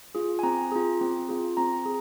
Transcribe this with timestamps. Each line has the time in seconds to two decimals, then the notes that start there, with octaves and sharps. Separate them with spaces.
0.15 F4 G#4
0.39 G#5
0.43 C4 A#5
0.72 F4 G#4
1.01 C4
1.29 F4 G#4
1.57 C4 A#5
1.86 G#4